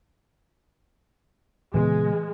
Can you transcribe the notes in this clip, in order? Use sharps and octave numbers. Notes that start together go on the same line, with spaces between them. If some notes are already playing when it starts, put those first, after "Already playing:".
A#2 C#3 E3 G#3 B3